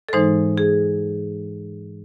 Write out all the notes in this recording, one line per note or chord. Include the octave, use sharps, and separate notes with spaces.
A4
G#2 E3 G#3 D#4 C5
G#4